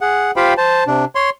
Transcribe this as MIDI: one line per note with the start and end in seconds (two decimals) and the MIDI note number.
0.01 0.31 68
0.01 0.31 78
0.36 0.54 65
0.36 0.54 67
0.36 0.54 72
0.36 0.54 77
0.36 0.54 79
0.36 0.54 83
0.57 0.84 72
0.57 0.84 81
0.87 1.05 48
0.87 1.05 62
1.15 1.30 73
1.15 1.30 84